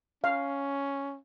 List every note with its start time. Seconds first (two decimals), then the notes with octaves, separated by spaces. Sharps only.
0.24 C#4 F5